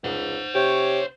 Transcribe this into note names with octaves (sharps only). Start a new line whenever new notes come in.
C#2 C5 F#5
C3 G4 C#5